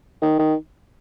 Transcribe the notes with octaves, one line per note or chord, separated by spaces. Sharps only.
D#3
D#3